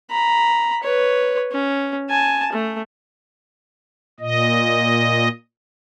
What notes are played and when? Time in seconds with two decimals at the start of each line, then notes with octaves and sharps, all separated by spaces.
0.10 A#5 B5
0.83 B4 C#5
1.52 C#4
2.10 G#5 A5
2.52 A3
4.20 A#2 D#5